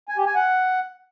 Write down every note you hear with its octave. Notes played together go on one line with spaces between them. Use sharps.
G#5
G4
G#5
F#5